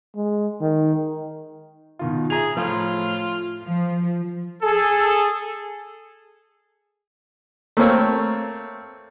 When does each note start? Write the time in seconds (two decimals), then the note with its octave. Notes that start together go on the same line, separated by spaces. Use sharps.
0.15 G#3
0.61 D#3
1.99 B2 D#3 F4
2.30 G#4 E5 A#5 F7
2.57 A2 F3 F4
3.62 F3
4.62 G#4 A4
7.77 A3 A#3 C4 C#5